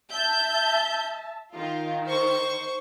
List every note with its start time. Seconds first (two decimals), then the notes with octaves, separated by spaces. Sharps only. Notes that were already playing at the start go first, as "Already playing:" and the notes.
0.11 E5 A5 G6
1.55 D#3 F4
2.05 C5 C#6